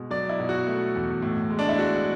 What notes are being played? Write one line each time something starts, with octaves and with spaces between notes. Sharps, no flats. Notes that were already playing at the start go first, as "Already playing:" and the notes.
Already playing: B2 G#3
F#3 D5
E4
B2
F#4
A3
E2
A2
G#3
D4
E4
G#3 F#4